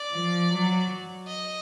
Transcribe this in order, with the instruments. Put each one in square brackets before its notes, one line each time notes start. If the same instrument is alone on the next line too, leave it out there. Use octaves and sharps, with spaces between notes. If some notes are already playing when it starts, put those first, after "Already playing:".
Already playing: [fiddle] D5
[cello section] F3
F#3
[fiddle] D#5